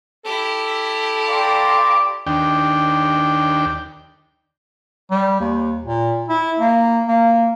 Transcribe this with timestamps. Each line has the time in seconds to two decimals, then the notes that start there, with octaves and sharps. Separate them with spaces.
0.25 E4 G4 A4
1.27 D5 F5 G5 A#5 C6 D6
2.27 D#2 D4 G5
5.11 G3
5.40 D#2
5.84 A#2
6.28 E4
6.59 A#3
7.08 A#3